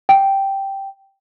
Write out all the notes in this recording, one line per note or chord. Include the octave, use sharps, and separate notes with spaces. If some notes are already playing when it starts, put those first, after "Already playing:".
G5